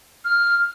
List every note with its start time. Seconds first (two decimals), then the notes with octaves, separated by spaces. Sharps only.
0.25 F6